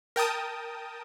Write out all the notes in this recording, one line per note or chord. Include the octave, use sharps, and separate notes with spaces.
A#4 G5 A5 D#6